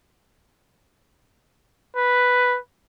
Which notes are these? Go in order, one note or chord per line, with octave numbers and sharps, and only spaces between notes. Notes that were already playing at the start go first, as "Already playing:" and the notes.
B4